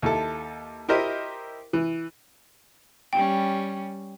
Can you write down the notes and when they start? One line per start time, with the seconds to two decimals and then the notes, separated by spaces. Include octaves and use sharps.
0.02 D#2 E4 A4
0.89 E4 G4 A#4 C5 D#5 E5
1.73 E3
3.13 G3 C#4 G5